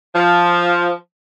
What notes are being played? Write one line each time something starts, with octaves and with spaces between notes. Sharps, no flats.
F3